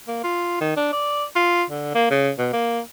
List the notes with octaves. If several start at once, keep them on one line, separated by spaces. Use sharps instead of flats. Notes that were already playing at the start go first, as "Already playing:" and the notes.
A#3
F4
D#3
D4
D5
F4
D3
A#3
C#3
B2
A#3